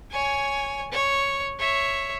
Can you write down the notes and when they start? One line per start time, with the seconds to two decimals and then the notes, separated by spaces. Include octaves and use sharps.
0.11 C#5 G#5
0.92 C#5
1.59 C#5 E5